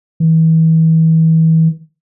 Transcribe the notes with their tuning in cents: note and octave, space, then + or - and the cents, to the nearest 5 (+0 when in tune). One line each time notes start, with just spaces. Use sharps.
E3 -35